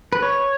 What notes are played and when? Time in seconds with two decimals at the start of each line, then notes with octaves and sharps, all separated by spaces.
0.13 B4
0.22 C#5